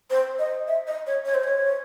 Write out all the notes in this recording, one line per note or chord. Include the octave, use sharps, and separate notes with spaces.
C5
D#5
E5
D#5
C#5
C#5
C5
C#5